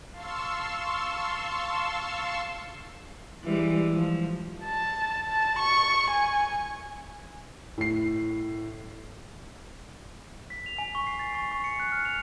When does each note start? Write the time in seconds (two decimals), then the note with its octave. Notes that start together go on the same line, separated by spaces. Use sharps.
0.11 F5 A5 C6 C#6 E6
3.44 E3 G3 G#3
3.94 F3
4.64 A5
5.28 A5
5.59 C#6
6.10 G#5
7.78 A2 C7
10.50 B6
10.66 F7
10.78 G#5
10.95 C#6
11.07 C7
11.19 A6
11.35 C#6
11.52 C#6
11.64 C#7
11.80 F#6
11.92 F6
12.05 F7